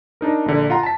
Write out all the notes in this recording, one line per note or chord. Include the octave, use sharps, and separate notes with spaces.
D4 D#4 A#4
A#1 D3
F4 F#5 A#5
A5 B6